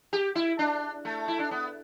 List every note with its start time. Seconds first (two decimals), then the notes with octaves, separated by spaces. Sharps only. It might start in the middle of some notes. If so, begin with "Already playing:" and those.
0.13 G4
0.35 E4
0.59 D4
1.05 A3
1.28 E4
1.39 D4
1.51 B3